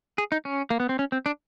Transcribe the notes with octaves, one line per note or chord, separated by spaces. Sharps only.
G#4
D#4
C#4
A#3
B3
C4
C#4
C4
D4